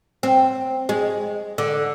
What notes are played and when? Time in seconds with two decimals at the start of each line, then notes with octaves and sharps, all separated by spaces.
0.23 C4
0.89 G#3
1.58 D3